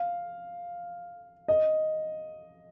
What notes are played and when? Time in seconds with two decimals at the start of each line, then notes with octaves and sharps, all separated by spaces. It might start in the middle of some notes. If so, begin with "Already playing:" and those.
Already playing: F5
1.48 D#5